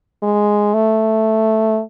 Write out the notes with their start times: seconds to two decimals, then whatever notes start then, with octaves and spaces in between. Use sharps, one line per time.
0.23 G#3
0.74 A3